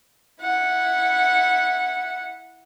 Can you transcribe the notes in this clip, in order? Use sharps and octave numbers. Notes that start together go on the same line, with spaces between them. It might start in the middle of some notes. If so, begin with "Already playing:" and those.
E4 F#5